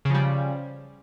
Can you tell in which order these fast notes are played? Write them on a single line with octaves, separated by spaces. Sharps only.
C#3 F3 G3